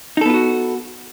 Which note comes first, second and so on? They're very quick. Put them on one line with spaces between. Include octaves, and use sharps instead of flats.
D#4 A4 B3 F4 F#4